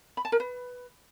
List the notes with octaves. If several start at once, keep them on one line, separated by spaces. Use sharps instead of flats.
B5
A5
A#4
B4